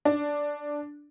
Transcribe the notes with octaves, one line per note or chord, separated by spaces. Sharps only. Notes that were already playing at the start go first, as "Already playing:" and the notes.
D4